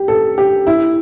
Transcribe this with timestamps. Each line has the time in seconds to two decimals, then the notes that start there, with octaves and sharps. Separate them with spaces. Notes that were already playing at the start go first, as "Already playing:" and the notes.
Already playing: G4
0.08 A4
0.38 G4
0.67 E4